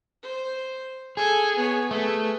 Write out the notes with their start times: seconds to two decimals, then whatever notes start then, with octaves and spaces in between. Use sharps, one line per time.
0.23 C5
1.17 G#4 A4 G#5
1.56 B3 C#5
1.91 A3 G#4 B4